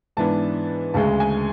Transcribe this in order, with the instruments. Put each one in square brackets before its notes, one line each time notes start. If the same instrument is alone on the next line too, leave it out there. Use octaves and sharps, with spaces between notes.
[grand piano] G#2 E3 B3 D4 A5
D2 C#3 G#3 A5
G#5